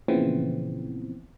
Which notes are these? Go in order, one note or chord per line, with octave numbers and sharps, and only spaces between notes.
A#2 C#3 E3 F3 B3 C4